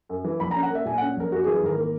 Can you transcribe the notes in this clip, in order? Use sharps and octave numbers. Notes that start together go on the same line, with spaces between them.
F#2
E3
A#1 B5
C#4 A#5
F#5
A#3
E5
A#2 G#5
C#4 F#5
A#1 A#4
F#2 F#4
G#4
E3
G#4
G#1 A#4
A#3